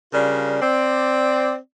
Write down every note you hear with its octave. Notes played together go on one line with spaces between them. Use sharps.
C#3 G3 D4 F4 A#4
C4 D5